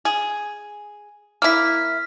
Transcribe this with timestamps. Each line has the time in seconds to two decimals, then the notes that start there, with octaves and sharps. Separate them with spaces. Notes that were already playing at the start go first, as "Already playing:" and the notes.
0.05 G#4
1.42 A#3 E4 F6 B6